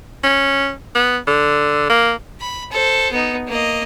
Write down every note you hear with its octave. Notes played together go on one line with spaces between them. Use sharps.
C#4
B3
D3
A#3
B5
A4 C5
B3 D#4
A#3 D#5